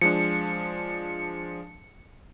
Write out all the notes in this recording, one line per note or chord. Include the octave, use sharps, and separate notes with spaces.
F3 G#3 D4 C#7